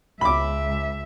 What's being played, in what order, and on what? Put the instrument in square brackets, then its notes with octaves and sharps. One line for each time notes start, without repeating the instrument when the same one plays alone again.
[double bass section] C#2 [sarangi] E5 [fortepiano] B5 D6